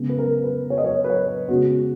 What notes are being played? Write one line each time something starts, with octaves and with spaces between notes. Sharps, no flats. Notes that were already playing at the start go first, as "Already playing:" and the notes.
Already playing: C#3 G#3 B3
B4
A#4
B4
C#5
D#5
C#5
B4
C#5
C#3 G#3 B3 F#4